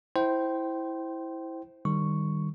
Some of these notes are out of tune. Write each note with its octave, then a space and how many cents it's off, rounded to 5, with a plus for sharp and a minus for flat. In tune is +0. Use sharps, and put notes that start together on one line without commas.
E4 -5 C5 +0 G5 -20
D#3 -20 G3 +0 C#6 +0